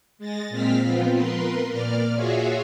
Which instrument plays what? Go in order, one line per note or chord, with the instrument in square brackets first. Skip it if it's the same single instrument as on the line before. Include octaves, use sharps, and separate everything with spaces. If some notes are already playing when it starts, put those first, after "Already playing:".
[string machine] G#3 A6 A#6
A#2 G#3 C4 F6 B6
F3 B3 C4 F4
A#4 B4 C6
A#2 D5 F6
F4 F#4 G#4 C#5 E5 F5